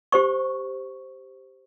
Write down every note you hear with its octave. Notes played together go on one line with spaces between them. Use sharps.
G4 C5 C#6